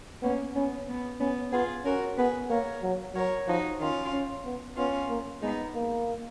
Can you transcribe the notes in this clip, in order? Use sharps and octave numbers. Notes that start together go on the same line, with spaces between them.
A#3 B3 C#4
B3 C#4
B3
B3 C#4
B3 F4 G#4
C#4 F#4 A#4
B3 G#4 B4
A#3 A#4 C#5
F#3
F#3 A#4 C#5
F3 D#4 F#4
D#3 C#4 F4
C#4
B3
B3 C#4 F4
A#3
G#3 B3 D#4
A#3